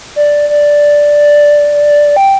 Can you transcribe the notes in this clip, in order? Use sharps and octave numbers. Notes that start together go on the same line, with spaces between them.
D5
D5
G5